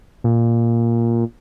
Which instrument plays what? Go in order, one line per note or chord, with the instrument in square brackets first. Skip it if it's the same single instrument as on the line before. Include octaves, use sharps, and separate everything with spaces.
[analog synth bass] A#2